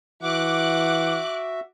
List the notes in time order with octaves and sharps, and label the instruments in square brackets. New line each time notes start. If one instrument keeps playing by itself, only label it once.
[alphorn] E3 [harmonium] F#4 E5 [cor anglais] F#5 [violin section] D6 F#6